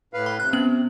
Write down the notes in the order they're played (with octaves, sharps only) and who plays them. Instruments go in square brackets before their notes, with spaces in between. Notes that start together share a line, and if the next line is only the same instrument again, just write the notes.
[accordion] A2 B4 F5
[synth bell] B5
[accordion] C3 [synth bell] F#6
[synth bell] B3 C#4 F#7